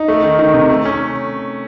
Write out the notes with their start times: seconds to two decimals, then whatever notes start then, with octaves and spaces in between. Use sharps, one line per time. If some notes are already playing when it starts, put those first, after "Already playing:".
Already playing: D#4
0.08 A3
0.23 D#3
0.39 D#3
0.54 C3
0.69 A3
0.85 C#4